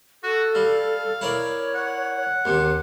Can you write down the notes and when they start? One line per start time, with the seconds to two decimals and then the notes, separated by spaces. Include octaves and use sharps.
0.24 F#4 A4
0.55 G3 F5
1.21 E4 A#4 C#5 D5
1.75 F#5
2.45 D#2 C3